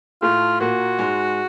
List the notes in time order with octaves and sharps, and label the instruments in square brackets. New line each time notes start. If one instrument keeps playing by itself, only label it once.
[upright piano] A2 A3 [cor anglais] F4
[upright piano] A#2 A#3 [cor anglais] F#4
[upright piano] G#2 G#3